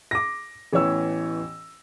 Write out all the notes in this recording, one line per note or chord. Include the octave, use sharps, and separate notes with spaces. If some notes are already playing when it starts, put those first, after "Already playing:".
D6 A#6
A1 E3 B3 C#5 E6